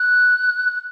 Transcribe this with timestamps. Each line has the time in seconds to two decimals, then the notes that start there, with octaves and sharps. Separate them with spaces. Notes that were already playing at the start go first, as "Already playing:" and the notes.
Already playing: F#6